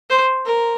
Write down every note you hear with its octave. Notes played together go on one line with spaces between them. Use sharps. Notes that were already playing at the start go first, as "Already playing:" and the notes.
C5
A#4